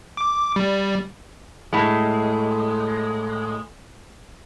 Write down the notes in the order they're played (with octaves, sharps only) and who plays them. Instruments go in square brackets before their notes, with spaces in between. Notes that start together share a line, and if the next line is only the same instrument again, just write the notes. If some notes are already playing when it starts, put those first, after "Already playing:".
[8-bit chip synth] D6
G3
[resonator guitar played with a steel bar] A2 G#3